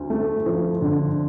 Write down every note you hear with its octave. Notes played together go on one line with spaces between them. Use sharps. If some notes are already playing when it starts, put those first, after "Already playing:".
Already playing: D2
A3
F3
D3